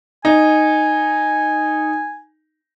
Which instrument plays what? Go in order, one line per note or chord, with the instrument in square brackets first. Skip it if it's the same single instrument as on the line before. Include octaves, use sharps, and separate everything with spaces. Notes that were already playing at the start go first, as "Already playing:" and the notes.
[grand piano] D#4 [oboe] G#5